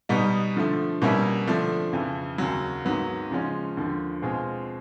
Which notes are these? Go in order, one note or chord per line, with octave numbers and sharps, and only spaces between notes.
B2 G3 B3 D#4
D3 F3 A3
B2 G3 A#3 C#4 E4
D3 F3 A3 D4
F2 C#3 E3
D#2 C#3 F#3
G#2 D#3 F#3 B3
C#3 F3 G#3 C#4
D#2 D3 F3
B2 G#3 C4 F4 G#4